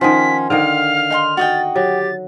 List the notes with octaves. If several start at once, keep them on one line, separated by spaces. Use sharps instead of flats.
D#3 F3 C#4 C5 F#5 B6
D3 D#3 F5 F6
D#4 G#5 C6
F#4 D#5 G5 A6
F#3 G4 A6